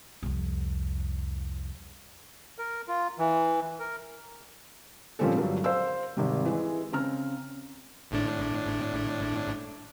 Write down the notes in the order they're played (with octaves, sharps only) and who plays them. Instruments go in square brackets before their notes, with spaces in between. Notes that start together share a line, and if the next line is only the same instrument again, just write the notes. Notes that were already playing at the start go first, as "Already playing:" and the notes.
[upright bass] C2 F2
[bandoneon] A#4
F4
E3
A#4
[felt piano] A#2 F3 G3 C4 C#4 A4
G2 D3 F#3 G3
C5 F5 E6
G#1 C3 G3
E3 G#3
C#3 C4 A#5 F6
[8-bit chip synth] G#1 A2 D4